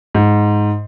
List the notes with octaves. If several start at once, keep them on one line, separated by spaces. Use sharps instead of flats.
G#2